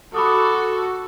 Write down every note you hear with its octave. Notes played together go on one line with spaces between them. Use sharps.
F#4 A4 B5 D6 D#6